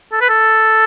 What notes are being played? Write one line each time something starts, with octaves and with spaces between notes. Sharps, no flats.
A4
B4
A4